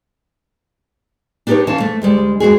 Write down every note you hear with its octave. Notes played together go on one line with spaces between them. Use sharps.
D4 D#4 G4 A#4 B4 C#5
C3 E3 C#4 F5 A5
A3
D2 G3 G#3
F2 G#3 F#4 G#4